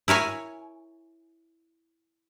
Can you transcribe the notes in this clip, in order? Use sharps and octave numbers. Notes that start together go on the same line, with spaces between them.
E4 A#4 C#5 G#5